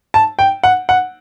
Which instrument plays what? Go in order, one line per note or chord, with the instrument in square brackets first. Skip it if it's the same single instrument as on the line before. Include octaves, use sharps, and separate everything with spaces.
[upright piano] A5
G5
F#5
F#5